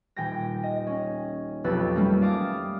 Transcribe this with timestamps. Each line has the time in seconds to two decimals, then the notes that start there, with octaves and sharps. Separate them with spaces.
0.16 D#1 G5 G#5 A#6
0.63 D#5
0.87 C#4
1.64 B1 F2 G4 B4 E6 A6
1.95 G3 A3 A#3 C#4
2.21 D5 F5 A5 D6 D#6